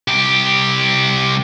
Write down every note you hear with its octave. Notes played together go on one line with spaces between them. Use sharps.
C2 G4